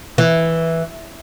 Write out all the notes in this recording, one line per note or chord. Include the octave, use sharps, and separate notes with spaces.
E3